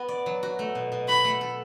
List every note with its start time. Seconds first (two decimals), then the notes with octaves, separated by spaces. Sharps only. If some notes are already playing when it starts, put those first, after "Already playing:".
Already playing: B3 F#4
0.08 D5
0.26 F#3
0.43 F#4
0.59 A3
0.75 B2
0.92 B2
1.08 F#4 B5
1.24 A3
1.41 A4